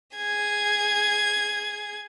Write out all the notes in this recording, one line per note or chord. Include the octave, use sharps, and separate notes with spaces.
G#4 G#6